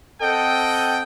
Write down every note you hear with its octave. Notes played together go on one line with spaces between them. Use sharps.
C4 A4 D#5 F#5 G5